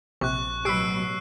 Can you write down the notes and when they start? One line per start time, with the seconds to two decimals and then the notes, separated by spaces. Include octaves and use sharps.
0.21 A#1 C3 C#6 F#6
0.65 A1 B2 F#3 G4 B4 E6 C7 D7